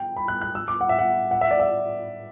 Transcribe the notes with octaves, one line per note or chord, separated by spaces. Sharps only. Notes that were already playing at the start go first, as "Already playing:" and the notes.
Already playing: G5
B5
F#6
F#6
E6
D6
F#5
E5
F#5
F#5
E5
D5
E5